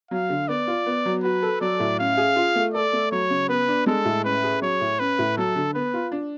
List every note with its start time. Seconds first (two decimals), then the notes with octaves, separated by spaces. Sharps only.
0.11 F#3 F5
0.30 D3
0.48 B3 D5
0.67 F4
0.86 B3
1.06 F#3
1.23 F#4 B4
1.43 A4
1.61 F#3 D5
1.80 A2
1.99 C#4 F5
2.17 G#4
2.36 F4
2.55 A3
2.74 A4 D5
2.93 A3
3.11 F#3 C#5
3.30 C#3
3.49 B3 B4
3.68 D4
3.86 G#3 A4
4.05 A2
4.24 C#4 B4
4.44 G#4
4.61 F#3 C#5
4.81 A2
4.99 C#4 B4
5.19 A2
5.37 F#3 A4
5.55 D3
5.74 B3 B4
5.94 F4
6.12 D4